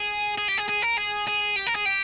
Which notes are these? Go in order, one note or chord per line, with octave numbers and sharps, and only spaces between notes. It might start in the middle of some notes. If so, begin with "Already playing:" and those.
Already playing: G#4
G#4
G4
G#4
G#4
A#4
G#4
G#4
G4
A#4
G#4
G4